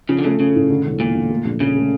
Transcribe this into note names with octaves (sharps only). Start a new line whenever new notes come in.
C#3 F3
D3
C#3 A3
C#3 C#4
A2
D3
E1
E1 A#2
D3
A3
A#1
A#1 C#3
A3